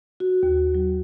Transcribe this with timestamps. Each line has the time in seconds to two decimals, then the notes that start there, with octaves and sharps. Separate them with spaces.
0.20 F#4
0.43 D#2
0.75 F#3